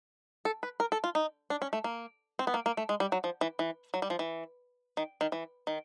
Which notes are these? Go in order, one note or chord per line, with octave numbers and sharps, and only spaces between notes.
A4
B4
A#4
A4
F4
D#4
D4
C#4
A3
A#3
C4
B3
A#3
A#3
A3
G#3
G3
F#3
F3
E3
E3
F#3
G3
F3
E3
D#3
D#3
E3
D#3